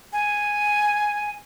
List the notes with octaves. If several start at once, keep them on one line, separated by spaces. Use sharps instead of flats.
G#5